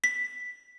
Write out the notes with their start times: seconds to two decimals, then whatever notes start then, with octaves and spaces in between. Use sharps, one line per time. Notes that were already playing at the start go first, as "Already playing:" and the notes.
0.04 B6